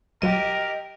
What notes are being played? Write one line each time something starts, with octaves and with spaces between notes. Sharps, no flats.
B1 F#3 G4 A#4 D#5